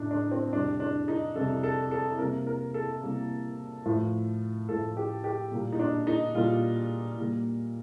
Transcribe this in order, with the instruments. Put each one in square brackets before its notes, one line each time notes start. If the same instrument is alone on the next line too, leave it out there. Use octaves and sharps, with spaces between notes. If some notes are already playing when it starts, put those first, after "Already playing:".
Already playing: [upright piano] A2 A3 D4 D#4
D4
C4
F2 C3 G3 D4
D4
D#4
F2 C3 G3 A4
A4
A4
C3 G3 A#3 A#4
A#4
A4
C3 G3 A#3
A2 F3 A3
A2 F3 A3 A4
G4
G4
A#2 G3 A#3
D#4
D4
D#4
A#2 G3 A#3 F4
A#2 G3 A#3